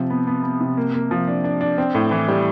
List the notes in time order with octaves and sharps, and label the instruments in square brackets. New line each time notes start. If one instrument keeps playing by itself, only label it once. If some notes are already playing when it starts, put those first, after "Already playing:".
Already playing: [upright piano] C3 F3
B3
B3
B3
C3
A#3
A#3
F3
D4
D4
D4
C4
A2
E3
G3